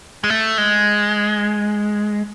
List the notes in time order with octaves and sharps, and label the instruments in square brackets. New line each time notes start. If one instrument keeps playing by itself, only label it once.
[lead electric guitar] G#3
A3
G#3